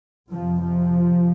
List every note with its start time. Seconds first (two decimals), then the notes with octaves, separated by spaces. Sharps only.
0.31 F2 C3 F3
0.62 F3